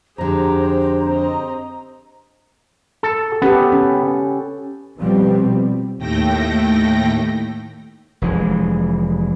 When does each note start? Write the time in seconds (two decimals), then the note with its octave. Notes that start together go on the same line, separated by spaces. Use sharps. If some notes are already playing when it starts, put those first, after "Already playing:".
0.18 F2 D3 G4 G#4 C5 A#5
1.05 C4 D#5
3.03 A4
3.42 B3 C#4 G4 A4
3.72 C#4
4.99 B2 F3 G3 B3 C4
5.98 D#2 A2 A3 G5 A#6
8.22 F1 E3 G#3